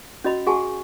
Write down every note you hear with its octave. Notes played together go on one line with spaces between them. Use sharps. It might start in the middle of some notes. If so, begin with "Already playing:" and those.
C#4 F#4 D#5 B5
F#4 G#4 F#5 G#5 A5 C#6